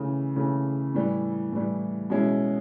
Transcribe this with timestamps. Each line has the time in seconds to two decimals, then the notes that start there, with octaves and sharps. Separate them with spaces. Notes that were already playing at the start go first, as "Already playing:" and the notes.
Already playing: C#3 E3 A3
0.36 C#3 E3 A3
0.95 A2 E3 G3
1.52 A2 E3 G3
2.10 B2 G#3 C#4 E4